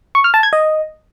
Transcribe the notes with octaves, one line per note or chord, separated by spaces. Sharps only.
C#6
F6
A5
G#6
D#5